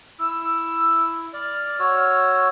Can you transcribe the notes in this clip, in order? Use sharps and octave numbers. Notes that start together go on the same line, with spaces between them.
E4 E6
D5 F6
F#4 C#5 E6